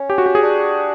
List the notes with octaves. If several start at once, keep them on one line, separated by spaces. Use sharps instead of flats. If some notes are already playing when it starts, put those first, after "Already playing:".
Already playing: C#4
G4
F#4
G4
G#4
D4